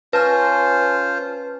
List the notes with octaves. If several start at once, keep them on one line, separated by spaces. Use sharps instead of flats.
C#4 F4 B4 C5 A5 F6